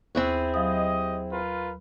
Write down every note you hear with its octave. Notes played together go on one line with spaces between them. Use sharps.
D#2 C4 E4 G#4 C#6 F#6
F#3 G4 D#5 F5 D#6
F4 A#4 B4